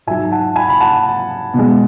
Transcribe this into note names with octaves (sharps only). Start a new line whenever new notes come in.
G#2 F#3 E5 G#5
F#5 A5
G#5 B5
B5
F#5 A5
B2 G#3